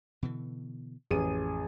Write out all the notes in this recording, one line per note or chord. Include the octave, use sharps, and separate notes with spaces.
B2 D3 E3
A1 F2 G#4 D#7